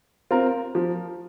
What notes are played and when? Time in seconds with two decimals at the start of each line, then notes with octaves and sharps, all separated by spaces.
0.31 C4 F4 A#4
0.75 F3